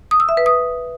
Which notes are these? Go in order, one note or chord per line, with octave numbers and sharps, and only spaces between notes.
D#6
E6
E5
B4
D#6